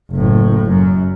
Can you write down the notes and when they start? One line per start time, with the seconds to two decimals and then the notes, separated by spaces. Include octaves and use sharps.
0.12 F#1 A2
0.69 F#2